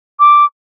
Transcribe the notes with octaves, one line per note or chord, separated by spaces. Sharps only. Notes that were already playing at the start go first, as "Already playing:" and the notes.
D6